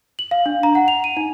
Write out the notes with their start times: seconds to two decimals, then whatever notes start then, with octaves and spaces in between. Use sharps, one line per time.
0.19 F#7
0.31 F5
0.46 D4
0.63 A#5
0.75 F#5
0.88 F7
1.04 D#7
1.17 D#4